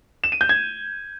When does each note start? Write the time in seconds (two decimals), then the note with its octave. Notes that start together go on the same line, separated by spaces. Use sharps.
0.24 E7
0.32 D#7
0.41 G6
0.49 G#6